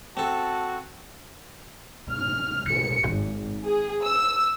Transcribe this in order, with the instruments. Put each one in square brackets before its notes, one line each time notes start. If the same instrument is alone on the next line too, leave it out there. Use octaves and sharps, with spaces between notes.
[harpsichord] C4 A4 [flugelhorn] F#4 [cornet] A5
[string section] F6
C#7
G#1
G#4
E6